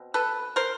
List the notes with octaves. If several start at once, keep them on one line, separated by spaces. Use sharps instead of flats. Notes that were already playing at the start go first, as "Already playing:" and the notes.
Already playing: B2 C4
A4 B4
A#4 C5